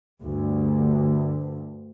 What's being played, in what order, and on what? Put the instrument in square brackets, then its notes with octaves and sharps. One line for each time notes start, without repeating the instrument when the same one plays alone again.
[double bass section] D2 G2